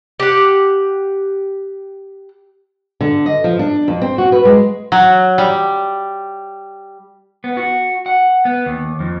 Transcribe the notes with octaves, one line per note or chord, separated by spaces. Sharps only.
G4 F#5
D3
D#5
F3
D4
F2
C4
F#4
B4
G#3
F#3
G3
B3
F#4
F#5
B3
D#2
F2